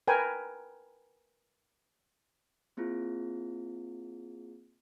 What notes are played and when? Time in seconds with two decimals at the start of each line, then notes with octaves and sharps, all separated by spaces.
0.08 A#4 B4 G5 G#5
2.77 A#3 C4 E4 F4 G#4